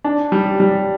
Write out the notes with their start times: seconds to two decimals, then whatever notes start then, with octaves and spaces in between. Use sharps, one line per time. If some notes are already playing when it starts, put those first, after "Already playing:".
0.04 D4
0.32 G3
0.60 G3